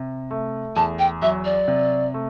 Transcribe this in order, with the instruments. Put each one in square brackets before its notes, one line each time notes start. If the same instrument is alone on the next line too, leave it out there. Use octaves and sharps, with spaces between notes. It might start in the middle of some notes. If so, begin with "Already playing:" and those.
Already playing: [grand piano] C3
A3
[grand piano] E2 [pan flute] A5
[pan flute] G5
[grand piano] F#3 [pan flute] E5
[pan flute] D5
[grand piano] C3
A3